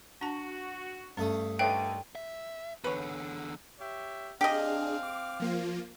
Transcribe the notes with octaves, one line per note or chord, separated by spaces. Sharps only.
D4 F#4 A5
G2 A3 C#4 D#6
D3 D#3 B4 C#5 E5 G5
E5
E2 D3 B4 C#5
G4 C#5 E5
C4 D4 G4 G#4 D#5 F5
D6
F3 A#3 F4